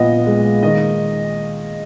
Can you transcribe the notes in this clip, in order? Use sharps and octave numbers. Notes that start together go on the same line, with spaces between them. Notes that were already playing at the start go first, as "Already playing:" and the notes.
Already playing: A#1 A#2 B3 D#5 F#5
G#3
D#3 D#5